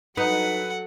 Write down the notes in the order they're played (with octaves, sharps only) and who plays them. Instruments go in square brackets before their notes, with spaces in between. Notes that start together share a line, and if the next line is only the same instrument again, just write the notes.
[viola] F#3 A4 [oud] D#4 [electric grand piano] B4 [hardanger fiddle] F#5